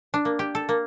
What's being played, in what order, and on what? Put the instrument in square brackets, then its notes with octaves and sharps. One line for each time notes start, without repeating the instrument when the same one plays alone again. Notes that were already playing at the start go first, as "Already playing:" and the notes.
[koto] D4
A#3
G4
A4
A#3